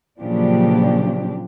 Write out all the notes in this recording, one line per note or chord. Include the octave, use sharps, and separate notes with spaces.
A#2 C#3 F3 F#3 D4 G4